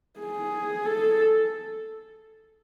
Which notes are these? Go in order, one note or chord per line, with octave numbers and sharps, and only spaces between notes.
G#4
A4